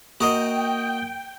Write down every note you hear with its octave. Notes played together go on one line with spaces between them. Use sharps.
A#3 F#4 A#4 D#5 G5 D#6